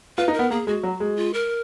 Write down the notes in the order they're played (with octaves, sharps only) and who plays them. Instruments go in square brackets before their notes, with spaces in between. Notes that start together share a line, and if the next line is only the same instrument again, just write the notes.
[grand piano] F4 [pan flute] B4
[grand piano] D#4
[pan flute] A#4
[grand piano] B3
[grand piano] A#3 [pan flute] G#4
[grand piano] G#3 [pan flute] F#4
[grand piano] F#3
G#3
[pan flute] F4
A#4